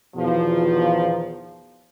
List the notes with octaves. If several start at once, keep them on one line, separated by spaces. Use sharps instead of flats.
E2 B2 D#3 F3